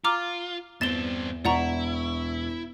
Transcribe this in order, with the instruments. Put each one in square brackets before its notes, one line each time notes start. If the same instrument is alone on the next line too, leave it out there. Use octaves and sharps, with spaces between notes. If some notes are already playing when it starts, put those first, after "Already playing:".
[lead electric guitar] F4 [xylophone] A#5 D6 F6
[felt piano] E2 E7 [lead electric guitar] G2 C4 [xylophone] A6 G7
[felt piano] E1 C#6 [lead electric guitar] E4 [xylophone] D5 F#5 A#5